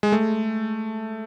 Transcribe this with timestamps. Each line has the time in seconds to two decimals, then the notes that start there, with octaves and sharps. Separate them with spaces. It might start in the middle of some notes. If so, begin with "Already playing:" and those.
0.03 G#3
0.12 A3